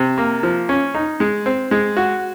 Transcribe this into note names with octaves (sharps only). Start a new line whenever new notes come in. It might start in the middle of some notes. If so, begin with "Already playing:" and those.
Already playing: C3
A#3
F3
C#4
D#4
G#3
C4
G#3
F#4